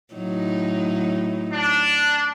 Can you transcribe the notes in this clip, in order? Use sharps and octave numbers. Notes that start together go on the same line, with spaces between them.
A2 F#3 D#4
D4